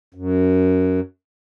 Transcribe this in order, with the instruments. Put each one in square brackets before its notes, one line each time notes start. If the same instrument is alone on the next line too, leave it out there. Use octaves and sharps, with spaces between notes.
[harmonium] F#2